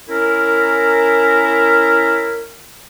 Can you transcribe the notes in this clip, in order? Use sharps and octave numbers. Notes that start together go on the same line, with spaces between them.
C#4 E4 A#4